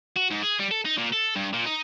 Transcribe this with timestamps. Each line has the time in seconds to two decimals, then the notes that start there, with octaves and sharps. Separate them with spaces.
0.16 F#4
0.31 G#2
0.43 G#4
0.59 G3
0.71 A4
0.86 D#4
0.98 A#2
1.13 A4
1.36 G2
1.54 A#2
1.66 D#4